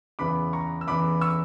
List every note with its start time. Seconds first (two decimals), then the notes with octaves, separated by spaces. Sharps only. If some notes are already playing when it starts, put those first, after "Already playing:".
0.19 E2 C#3 E3 B3 B5 D6
0.53 A#5 C#6
0.81 E6
0.87 E2 C#3 E3 B3 B5 D6
1.21 C#6 E6